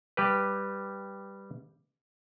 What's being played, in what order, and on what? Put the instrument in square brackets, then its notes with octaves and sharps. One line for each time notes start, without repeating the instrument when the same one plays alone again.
[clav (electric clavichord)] G3 G4 B4